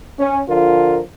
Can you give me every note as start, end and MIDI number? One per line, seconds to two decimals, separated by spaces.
0.20 0.40 61
0.50 1.00 50
0.50 1.00 53
0.50 1.00 65
0.50 1.00 70